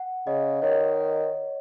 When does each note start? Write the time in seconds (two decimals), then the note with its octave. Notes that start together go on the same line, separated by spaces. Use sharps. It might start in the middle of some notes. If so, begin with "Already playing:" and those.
Already playing: F#5
0.27 C#3 D#5
0.62 D#3 C#5